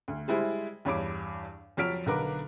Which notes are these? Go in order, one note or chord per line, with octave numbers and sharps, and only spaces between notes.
D2
G3 G#3 E4 C5
E2 G2 C#5 B5 D6 D7
F2 F3 F#3 F6 B6 D7
B1 D3 A#4 B4 D6